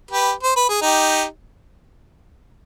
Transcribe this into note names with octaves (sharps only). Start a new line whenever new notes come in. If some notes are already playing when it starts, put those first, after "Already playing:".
G4 B4
C5
B4
G#4
D#4 G4